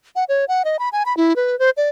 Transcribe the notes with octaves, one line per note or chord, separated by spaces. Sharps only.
F#5
C#5
F#5
D#5
B5
G#5
B5
E4
B4
C5
D5